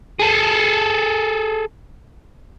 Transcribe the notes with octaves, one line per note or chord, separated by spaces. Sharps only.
G#4 A4